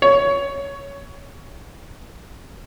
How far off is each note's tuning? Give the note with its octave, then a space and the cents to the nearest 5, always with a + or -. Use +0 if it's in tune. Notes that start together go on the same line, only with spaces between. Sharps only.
C#5 +15